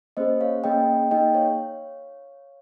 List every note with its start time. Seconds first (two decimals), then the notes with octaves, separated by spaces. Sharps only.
0.17 A#3 C#4 G#4 C5 D#5
0.41 C#5 F5
0.64 A#3 C#4 G#4 D#5 G5
1.11 A#3 D#4 G#4 D#5 G5
1.35 C#5 F5